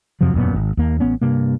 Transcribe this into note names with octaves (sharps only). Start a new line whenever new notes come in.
F2 C3 F3 F#3
E1 F#2 A#2 B3
G#1
D#2 A#3
A1 B3 C#4
G2 C3 A#3